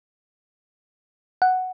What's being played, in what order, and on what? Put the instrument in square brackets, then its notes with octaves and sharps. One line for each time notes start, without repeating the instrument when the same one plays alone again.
[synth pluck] F#5